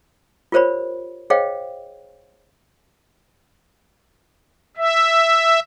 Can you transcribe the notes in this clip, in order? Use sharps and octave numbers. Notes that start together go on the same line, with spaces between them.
F4 G4 A#4 C5 C#5 B5
G#4 C5 C#5 D#5 F5 G5
E5